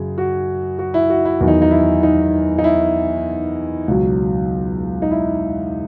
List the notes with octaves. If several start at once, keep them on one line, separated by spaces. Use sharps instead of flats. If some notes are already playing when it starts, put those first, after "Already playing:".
Already playing: F#2 C#3 F#3 G#4
F#4
F#4
E4
F#4
E4
E2 D#3 F#3 E4
D#4
D#4
E4
D#4
D#4
E4
C#2 B2 F#3
D#4
E4